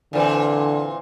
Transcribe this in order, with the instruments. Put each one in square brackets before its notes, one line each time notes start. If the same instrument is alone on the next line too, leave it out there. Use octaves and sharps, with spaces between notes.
[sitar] A#2 E3 C4 [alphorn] D3